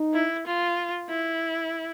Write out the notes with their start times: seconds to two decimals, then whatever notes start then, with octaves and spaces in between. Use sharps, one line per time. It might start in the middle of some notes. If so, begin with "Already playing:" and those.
Already playing: D#4
0.14 E4
0.47 F4
1.10 E4